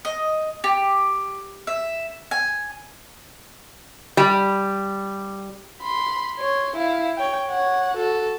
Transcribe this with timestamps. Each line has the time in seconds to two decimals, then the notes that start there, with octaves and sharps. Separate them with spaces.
0.05 D#5
0.64 G4
1.67 E5
2.31 G#5
4.17 G3
5.81 B5 C6
6.35 C#5 C6
6.76 E4 F5
7.17 C#5 G5
7.49 C#5 F#5
7.97 F#4 A4